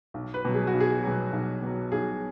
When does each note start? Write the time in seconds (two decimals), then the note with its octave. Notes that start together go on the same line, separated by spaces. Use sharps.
0.14 B1
0.34 B4
0.45 B2 F#3
0.54 G#4
0.67 F#4
0.74 B1
0.80 G#4
1.04 B2 F#3
1.33 B1
1.62 B2 F#3
1.92 B1 G#4